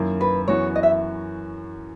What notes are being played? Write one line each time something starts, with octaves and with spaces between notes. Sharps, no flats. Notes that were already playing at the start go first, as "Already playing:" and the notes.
Already playing: F#2 D#3 A#3 E4
B4
F#2 E3 B3 F#4 C#5
D#5
E5